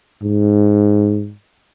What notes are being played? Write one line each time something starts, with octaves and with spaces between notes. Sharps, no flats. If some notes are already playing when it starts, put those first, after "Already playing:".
G#2